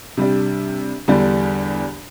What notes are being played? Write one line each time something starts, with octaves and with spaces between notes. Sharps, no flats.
C3 G3 D4
E2 D3 G3 D4